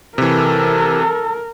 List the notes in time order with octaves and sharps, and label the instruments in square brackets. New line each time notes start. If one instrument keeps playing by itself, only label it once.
[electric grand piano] C3 E3 [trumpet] A4 [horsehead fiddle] A#4